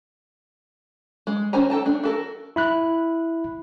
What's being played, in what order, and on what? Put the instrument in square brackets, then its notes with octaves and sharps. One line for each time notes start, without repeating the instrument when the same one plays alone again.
[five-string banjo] G#3
D#3 C#4 C5 G#5 A#5
A4 G5 A5 A#5
A3 D4
F#4 A4 A#4
[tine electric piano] E4 B5 F#6